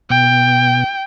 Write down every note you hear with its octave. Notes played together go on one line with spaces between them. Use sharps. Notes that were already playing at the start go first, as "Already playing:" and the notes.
B2 G5